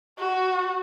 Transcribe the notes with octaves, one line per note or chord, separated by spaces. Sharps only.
F#4